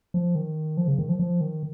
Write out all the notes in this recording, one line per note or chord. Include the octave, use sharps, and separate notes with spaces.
F3
D#3
F3
C#3
D#3
F3
F3
D#3